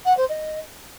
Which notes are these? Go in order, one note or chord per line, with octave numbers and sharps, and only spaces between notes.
F#5
C5
D#5